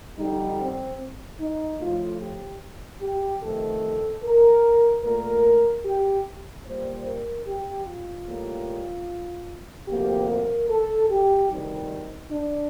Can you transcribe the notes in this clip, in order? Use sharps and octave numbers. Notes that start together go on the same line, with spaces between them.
F2 D3 G3 D#4
C4
D#4
A2 F3 A3 F4
G4
G4
F2 C3 D#3 A3 A4
A#4
A#2 A3 A#4
G4
A#2 G3 A#3 C5
A#4
G4
F4
A2 G3 A#3
D2 C3 F3 A#3 G4
A#4
A4
G4
D2 C3 D#3 G3 D#4
D4